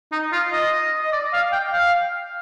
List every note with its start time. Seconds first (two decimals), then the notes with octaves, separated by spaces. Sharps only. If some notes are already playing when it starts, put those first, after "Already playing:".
0.12 D#4
0.32 F4
0.53 D#5
1.03 D#5
1.12 D5
1.33 F5
1.52 G5
1.73 F5